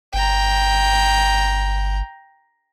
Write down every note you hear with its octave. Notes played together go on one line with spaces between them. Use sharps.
G1 G5 A#5